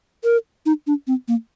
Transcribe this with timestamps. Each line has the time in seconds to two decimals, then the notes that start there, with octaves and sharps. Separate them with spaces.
0.24 A#4
0.66 D#4
0.87 D4
1.07 C4
1.28 A#3